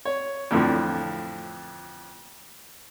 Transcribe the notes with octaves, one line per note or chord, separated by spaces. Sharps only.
C#5
F2 A2 D3 E3 F3